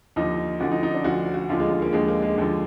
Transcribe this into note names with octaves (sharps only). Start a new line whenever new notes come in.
D#2 D3 F3 D#4
D2 D3 F3 F#4
D#4
D#4
D4
D2 D3 F3 F#4
F#4
D#2 D3 F3 F4
G#3
G#3
A#3
D#2 D3 F3 G#3
A#3
G#3
D#2 D3 F3